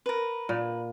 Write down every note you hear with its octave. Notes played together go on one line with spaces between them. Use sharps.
A#4 B4
A#2